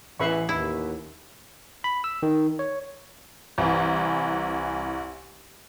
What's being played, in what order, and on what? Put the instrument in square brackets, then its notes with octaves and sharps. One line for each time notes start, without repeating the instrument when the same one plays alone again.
[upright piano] A1 B4 C7 [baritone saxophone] E3 [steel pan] E5 B5 C#6
[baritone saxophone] D#2 [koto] E4
[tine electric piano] B5
E6
D#3
C#5
[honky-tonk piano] C2 E3